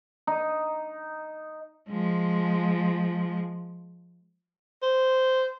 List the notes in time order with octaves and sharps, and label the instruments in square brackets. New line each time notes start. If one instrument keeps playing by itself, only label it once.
[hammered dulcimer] D#4
[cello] F3 G#3
[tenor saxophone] C5